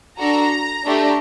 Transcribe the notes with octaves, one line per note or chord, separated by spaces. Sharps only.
D4 F#4 A4 A#5
A3 D4 G4